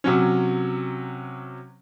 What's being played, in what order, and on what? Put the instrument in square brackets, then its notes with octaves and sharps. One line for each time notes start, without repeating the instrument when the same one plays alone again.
[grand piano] C3 F#3 C#4